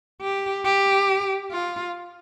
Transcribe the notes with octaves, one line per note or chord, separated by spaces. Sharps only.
G4
G4
F4